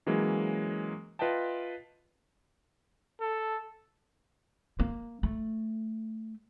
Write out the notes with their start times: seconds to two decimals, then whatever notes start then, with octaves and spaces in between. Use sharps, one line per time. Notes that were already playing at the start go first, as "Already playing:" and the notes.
0.06 E3 F#3 G#3 A#3 C#4
1.19 F4 B4 D#5 E5 G5 A5
3.21 A4
4.80 A#3
5.23 A3